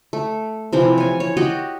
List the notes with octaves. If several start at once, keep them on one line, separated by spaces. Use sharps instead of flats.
A3
C3 E3 F3
C#5 G#5
C#5
F#4 G4 D#5 F#5